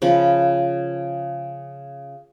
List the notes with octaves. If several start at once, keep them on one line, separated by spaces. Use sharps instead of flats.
C#3 F3 B5